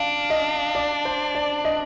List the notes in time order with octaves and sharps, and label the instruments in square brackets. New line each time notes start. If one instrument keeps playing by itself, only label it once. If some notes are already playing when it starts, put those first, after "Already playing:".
Already playing: [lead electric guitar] D4 [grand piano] F5
[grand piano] D#5
D5
C5
D5
D#5